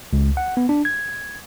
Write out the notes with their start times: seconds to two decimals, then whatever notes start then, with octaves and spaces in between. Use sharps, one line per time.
0.13 C#2
0.37 F#5
0.57 B3
0.69 D4
0.85 G#6